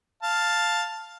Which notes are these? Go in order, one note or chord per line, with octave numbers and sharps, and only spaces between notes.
F5 A5